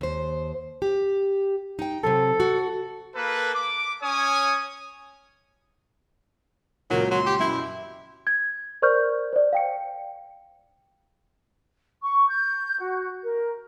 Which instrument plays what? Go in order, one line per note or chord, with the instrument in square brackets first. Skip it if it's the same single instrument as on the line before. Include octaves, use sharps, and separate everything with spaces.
[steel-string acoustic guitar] D#2 C5
G4
D#4 G5
[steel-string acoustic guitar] C3 F#3 C4 [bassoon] A4
[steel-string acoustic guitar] F#4
[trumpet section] A#3 A4 B4
D6
C#4 C#5 G#5 D#6
[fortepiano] C#2 A#2 [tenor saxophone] F#3 [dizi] A#4
[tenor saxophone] F#3 [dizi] C6
[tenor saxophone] G4
[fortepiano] F#2 B2 [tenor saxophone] E4
[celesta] G#6
A#4 C5 D5 C#6 F6 G6
C5 D5
F5 G5 C#7
[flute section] C#6
G6
F#4
A#4